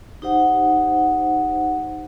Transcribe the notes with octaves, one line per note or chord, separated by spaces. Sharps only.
D#4 G4 C5 F#5